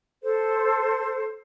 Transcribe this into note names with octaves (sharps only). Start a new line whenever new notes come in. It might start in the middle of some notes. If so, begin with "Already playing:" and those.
A4 C5